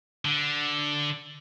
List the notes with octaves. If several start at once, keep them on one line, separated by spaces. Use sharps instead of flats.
D3